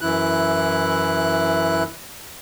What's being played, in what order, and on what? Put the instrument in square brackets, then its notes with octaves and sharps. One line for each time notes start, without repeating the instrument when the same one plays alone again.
[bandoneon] F#2 E3 E4 F#6